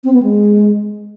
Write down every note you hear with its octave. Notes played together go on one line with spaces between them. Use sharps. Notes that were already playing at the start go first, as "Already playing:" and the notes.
C4
B3
G#3